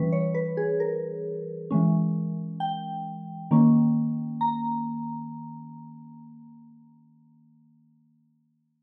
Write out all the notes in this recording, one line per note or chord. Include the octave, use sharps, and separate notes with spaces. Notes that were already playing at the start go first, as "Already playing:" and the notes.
Already playing: E3 G3 C#4 B4
C#5
B4
G#4
A#4
E3 G#3 C#4
G5
D#3 A#3 C#4
A#5